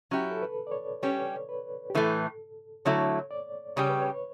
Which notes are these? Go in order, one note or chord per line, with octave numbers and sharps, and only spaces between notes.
F#3 C#4 E4 G4
A4
B4
D5
C#5
G3 C#4 G4 C#5
B4
G4
A2 E3 A3 A4
D3 F#3 A3 E4 C#5
D5
C#3 G3 C#4 G4 C#5
B4
C#5